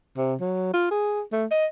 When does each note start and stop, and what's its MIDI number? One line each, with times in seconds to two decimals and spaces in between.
0.17 0.34 48
0.40 0.73 54
0.74 0.91 65
0.91 1.22 68
1.32 1.45 57
1.51 1.66 75